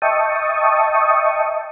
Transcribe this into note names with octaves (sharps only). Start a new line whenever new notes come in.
D#5 E5 G5 A5 C#6 D#6